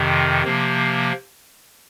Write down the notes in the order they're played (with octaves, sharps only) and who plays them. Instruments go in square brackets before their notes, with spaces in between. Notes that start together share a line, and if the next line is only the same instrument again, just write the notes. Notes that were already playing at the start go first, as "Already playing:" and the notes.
Already playing: [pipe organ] F2 C3 D#3
C3 F3 A#3